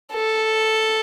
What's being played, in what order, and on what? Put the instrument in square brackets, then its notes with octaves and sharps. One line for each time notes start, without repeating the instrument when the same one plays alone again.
[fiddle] A4